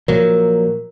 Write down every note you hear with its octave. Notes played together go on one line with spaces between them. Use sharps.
A#2 F3 F#3 A#4